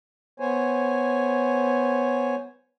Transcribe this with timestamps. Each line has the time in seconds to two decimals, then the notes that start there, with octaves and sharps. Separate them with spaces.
0.40 B3 C5 C#5 G#5